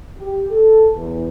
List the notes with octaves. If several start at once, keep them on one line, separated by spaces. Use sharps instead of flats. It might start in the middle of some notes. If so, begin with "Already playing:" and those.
G4
A4
E2